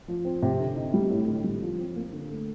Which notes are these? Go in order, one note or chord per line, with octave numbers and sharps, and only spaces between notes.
F3
C4
C3
D3
D#4
G3
A2
D3
G3
F3
C4
A#3
D3
A3